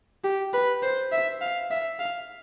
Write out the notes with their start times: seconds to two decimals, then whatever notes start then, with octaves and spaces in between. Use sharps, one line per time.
0.24 G4
0.53 B4
0.83 C5
1.12 E5
1.41 F5
1.71 E5
2.00 F5